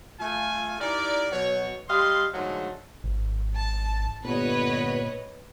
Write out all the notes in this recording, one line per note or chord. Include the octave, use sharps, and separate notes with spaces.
A3 F4 G#5
D#4 E4 G4 A#4 D5
B2 F#3 C#5
G3 G4 D#5 F5 C6
G#2 D3 F#3 G#3 A3 F4
G#1
A5
G1 A#2 B3 B4 C#5 D#5